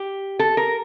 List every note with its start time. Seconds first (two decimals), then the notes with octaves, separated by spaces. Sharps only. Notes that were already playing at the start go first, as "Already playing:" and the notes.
Already playing: G4
0.39 A4
0.57 A#4